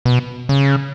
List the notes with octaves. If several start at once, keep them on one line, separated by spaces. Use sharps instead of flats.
B2
C#3